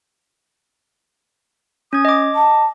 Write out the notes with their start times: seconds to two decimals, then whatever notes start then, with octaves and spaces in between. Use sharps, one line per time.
1.93 C#4 D#6 G#6
2.05 D#5 D6
2.35 A5